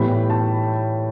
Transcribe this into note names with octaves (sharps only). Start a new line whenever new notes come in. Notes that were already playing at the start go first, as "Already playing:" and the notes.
Already playing: A2 E3 G3 B3 B5
A5